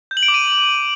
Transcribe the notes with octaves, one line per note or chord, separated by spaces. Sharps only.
G6
F#7
D7
D6
D#7